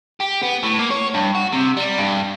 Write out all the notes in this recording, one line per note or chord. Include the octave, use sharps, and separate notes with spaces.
G4
B3
A2
A#3
C#5
G2
F#4
C3
G3
G2